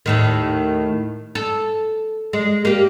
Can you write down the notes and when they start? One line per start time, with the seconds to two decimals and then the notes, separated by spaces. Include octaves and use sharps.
0.06 D#2 A2 D#3
1.35 A4
2.33 G#3
2.65 A#3 G4